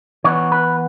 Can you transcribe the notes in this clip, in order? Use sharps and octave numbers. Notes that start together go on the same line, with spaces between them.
E3 B3 C#5
B4